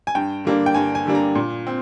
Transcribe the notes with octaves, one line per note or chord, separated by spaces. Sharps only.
G#5
G2 G5
D3 G3 A#3 D4
G5
G2 G#5
G#5
D3 G3 A#3 D4
A#5
A#2
C4